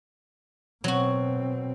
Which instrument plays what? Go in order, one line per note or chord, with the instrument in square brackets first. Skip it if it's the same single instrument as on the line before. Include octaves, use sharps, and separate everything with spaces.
[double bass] B2 C4 [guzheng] F#3 F#4